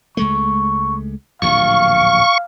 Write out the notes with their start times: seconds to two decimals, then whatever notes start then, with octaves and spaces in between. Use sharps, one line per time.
0.17 C#2 G#3 A3 C#6
1.42 D1 A#1 D#2 F5 C#6